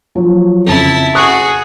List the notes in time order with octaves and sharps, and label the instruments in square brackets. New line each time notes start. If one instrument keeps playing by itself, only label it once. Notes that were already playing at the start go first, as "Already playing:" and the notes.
[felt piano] F3 F#3 F#4
[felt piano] F2 C#3 [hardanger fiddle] E4 A5
[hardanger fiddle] F#4 G#4 [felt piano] C#6 D#6 F#6